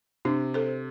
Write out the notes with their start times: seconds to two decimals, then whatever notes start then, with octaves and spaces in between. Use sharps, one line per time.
0.25 C3 D4
0.54 A4 C5